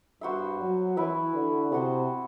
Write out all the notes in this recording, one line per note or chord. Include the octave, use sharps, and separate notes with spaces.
G2 B3 F#4 C5 E5
F#3
E3 E4 B4 E5
D3
C3 B3 F#4 C5